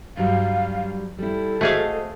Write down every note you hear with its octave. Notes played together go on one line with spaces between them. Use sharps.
G2 F#3 G3 F5
G3 E4 A4
A3 F#4 G#4 C5 D#5 F5